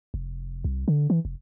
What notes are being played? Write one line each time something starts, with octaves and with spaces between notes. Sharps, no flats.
F1
C2
D3
E3
F1